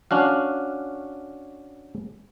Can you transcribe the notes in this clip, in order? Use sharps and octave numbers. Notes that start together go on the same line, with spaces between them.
C#4 D4 F#4 F5